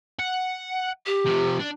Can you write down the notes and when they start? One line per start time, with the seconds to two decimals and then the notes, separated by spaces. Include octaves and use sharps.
0.19 F#5
1.06 G4
1.26 C3 F3
1.60 D4